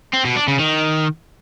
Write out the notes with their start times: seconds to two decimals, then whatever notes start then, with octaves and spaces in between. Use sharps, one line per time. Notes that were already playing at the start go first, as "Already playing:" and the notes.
0.14 C4
0.25 B2
0.36 D4
0.48 C#3
0.59 D#3